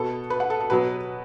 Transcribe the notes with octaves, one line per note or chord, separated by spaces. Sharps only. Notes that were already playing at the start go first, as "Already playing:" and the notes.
Already playing: B2 B3 A4
B4
F#5
A4
A4
B2 F#3 B3 B4